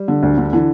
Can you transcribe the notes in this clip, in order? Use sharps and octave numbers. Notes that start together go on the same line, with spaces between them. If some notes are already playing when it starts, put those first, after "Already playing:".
Already playing: G3
D3
D2
D3
D3 E3